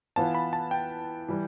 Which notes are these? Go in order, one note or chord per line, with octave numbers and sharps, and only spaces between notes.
E3 B3 F4 A5
B5
A5
G5
E3 G3